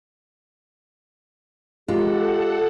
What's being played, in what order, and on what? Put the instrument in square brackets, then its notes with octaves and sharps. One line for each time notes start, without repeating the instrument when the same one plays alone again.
[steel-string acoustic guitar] G#3 [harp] F4 [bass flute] G4 [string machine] A4 F#5